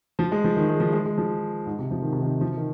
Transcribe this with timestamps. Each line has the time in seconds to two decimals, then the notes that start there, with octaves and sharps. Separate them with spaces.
0.19 F3
0.32 G#3
0.44 F3
0.56 D#3
0.69 G#3
0.80 F3
0.93 G#3
1.06 G#3
1.18 F3
1.66 G#2
1.79 C3
1.91 F3
2.02 D#3
2.13 C3
2.22 D#3
2.41 F3
2.57 D#3